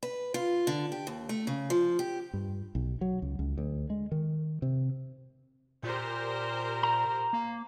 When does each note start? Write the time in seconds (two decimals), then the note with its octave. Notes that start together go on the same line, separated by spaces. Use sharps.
0.03 B4
0.34 F4
0.67 D3
0.92 G4
1.07 D#2
1.29 A3
1.47 C#3
1.70 F3
1.99 G4
2.33 G2
2.75 B1
3.01 F#3
3.22 C#2
3.39 C#2
3.58 D2
3.90 G#3
4.12 D#3
4.62 C3
5.83 A#2 G4 A#4 C5
6.83 A#5
7.33 A#3